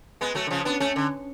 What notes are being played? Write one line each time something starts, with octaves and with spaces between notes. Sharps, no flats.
G#3 B3
F#3 A3
D3
C#3 F3
B3 D4
A3 C#4
D3